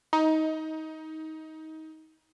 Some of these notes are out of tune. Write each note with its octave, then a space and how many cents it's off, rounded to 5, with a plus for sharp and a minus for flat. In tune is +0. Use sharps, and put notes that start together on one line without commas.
D#4 +20